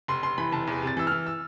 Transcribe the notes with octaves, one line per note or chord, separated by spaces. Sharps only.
F1 C6
F1 C6
E3 B5
F1 A5
E2
C3 A6
E3 E6
E3 F6
E6